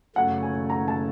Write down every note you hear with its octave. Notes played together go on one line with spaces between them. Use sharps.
F#2 C#3 F#3 A3 F#5
G#5
A#5
A5